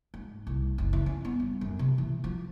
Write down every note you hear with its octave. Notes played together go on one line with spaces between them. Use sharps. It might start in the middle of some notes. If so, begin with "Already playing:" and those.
G#2
C2
F#1
E3
C#4
B3
G2
F#2
C3
E3
F3